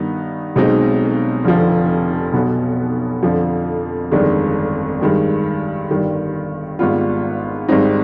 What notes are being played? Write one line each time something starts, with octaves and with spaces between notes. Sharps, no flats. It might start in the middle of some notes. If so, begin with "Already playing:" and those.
Already playing: G2 D#3 B3 D#4
B1 B2 G#3 C4 D#4
F1 F2 D3 F3
B1 B2 B3
F2 D3 F3
G1 F2 D#3 G#3 D4
G2 D#3 G#3
G1 G2 D#3 G3
G#1 G#2 G3 B3 F4
G#1 G#2 G3 C4 D#4